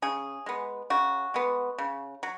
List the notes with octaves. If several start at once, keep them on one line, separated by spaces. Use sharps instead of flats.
C#3 G#4
G#3 B3
C#3 F#4
G#3 B3
C#3
F#3